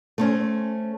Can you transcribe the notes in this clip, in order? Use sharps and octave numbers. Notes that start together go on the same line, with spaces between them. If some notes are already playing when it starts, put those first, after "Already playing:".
A3 C4 C#4